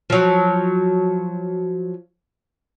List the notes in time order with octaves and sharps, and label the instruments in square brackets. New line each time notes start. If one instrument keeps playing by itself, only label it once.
[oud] F3 F#3